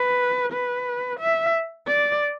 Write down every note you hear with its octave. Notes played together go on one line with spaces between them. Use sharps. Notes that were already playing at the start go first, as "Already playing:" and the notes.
Already playing: B4
B4
E5
D5